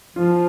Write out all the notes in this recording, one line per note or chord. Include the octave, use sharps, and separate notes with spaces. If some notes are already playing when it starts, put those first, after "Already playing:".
F3 F4